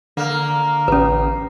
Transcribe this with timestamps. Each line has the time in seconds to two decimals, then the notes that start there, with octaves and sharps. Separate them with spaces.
0.17 D3 A#3 F6
0.88 A1 C#4 B4